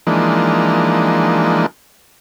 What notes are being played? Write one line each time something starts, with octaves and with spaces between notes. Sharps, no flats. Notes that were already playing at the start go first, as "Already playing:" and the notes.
E3 F3 G#3 A#3 D4 D#4